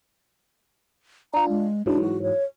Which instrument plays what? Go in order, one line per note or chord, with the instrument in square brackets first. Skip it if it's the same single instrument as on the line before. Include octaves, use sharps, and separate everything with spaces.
[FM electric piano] D4 F4 [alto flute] A#5
[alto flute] G#3
[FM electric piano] G#2 E3 F#3 [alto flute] D4
[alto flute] F#4
C#5